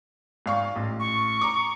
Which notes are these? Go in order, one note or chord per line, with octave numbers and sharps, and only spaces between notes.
G#1 F5 C#6
A1
C#6
A#5 D6